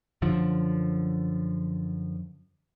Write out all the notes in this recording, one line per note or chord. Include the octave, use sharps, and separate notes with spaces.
F#2 D3 F3